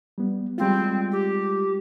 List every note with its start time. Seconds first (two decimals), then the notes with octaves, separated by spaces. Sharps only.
0.18 G3 B3
0.58 G3 G#3 C4 F4
1.12 G4